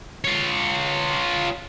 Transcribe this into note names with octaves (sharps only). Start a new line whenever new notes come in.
F4 C#5